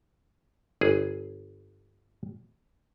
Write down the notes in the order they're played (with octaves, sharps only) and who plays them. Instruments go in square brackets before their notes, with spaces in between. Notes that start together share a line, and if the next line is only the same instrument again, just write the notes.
[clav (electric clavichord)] G1 G#4